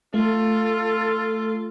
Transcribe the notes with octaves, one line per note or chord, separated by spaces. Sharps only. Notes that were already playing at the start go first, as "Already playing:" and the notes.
A3 F4 A4